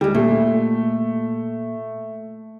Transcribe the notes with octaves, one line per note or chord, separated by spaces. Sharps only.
D2 G3 G#3
A#2 A3